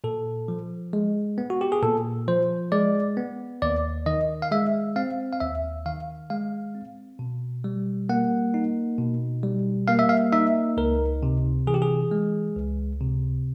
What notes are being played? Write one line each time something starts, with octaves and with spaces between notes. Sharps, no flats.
A#2 A4
F3
G#3
B3
F#4
G4
G#4
A#2 A4
F3 C5
G#3 D5
B3
D#2 D5
D#3 D#5
F5
G#3 E5
C4 F5
F5
D#2 E5
D#3 F5
G#3 F5
C4
B2
G3
A#3 F#5
D#4
B2
G3
A#3 F5
E5
F5
D#4 E5
C#2 A#4
C3
E3 G#4
G4
G#4
G#3
C#2
C3